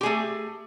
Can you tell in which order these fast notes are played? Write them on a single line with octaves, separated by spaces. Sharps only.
G4 G#4 A3